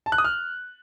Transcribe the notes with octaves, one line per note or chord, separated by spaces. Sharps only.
A5
F#6
D#6
F6